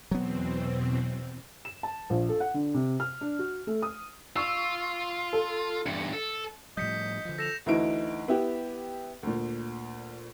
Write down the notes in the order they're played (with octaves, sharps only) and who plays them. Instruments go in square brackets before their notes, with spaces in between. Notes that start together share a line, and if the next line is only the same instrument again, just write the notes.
[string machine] E2 B2 C4 [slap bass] F#3 B3
[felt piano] E7
A5
A#1
A4
F#5
D3
C3
F6
D4
F#4
A3
D#6
[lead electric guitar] F4 [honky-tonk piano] C#6 E6
[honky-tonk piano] A4
[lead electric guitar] E2 G2 [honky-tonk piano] C#7
[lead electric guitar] A4
[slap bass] A2 F3 G3 [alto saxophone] D#5 [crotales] G6 B6 C#7
[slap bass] D3 F3
[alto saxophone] A4 [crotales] A#6 E7 F7
[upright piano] D2 E3 D#4 E4 F#4 D7
B3 E4 G4
D2 A#2